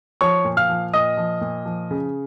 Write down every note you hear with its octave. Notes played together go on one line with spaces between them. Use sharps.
F3 C#5 C#6
A#2
F5 F6
F3
A#2 D#5 D#6
F3
A#2
F3
C#3